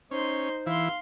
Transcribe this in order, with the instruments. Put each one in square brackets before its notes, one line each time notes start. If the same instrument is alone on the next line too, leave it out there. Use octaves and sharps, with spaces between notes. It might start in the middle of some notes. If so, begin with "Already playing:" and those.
[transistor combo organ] C#4 [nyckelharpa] D#4 C6 [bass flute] C5
[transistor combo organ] E3 E4 [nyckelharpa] F5 C6